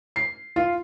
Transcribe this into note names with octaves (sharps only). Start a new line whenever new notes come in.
C7
F4